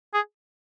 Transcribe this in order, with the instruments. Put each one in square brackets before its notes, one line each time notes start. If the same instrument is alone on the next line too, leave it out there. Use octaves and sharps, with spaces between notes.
[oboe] G#4